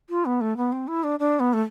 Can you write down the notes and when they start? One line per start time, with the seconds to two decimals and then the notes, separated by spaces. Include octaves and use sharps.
0.09 F4
0.25 B3
0.41 A3
0.57 B3
0.72 C4
0.87 E4
1.03 D4
1.19 D4
1.40 B3
1.53 A3